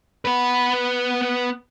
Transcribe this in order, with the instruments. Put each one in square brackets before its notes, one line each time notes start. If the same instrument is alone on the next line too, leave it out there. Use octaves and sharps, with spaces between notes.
[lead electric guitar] B3 B4